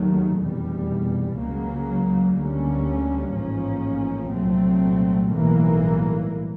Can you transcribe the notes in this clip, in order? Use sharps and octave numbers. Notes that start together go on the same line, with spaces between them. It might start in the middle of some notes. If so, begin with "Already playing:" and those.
Already playing: D#2 D#3 F#3 A3
F1 E2 B2 G3
C#2 C#3 F#3 A#3
D2 D3 G3 A#3 C#4
A1 G#2 F3 A#3 C#4
C2 A#2 F#3 A3 C4
B1 A2 E3 G3 A#3